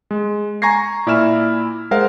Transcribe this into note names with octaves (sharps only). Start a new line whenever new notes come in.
G#3
G#5 A#5 C#6 G#6 A#6 C7
A#2 E4 D5 B5 F6 E7
G#3 A#4 C5 F5 F#5